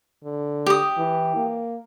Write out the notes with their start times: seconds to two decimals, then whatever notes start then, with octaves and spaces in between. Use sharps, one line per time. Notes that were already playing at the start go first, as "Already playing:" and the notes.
0.24 D3
0.66 G4 D#6
0.98 E3
1.36 A#3